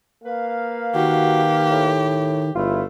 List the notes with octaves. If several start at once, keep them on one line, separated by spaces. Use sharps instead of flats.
A#3 B4 F5
D#3 F#4 G4
A2
G1 G#3 A3 E4 F4